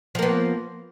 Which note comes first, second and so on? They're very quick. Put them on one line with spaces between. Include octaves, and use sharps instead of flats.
F3 A#3 B3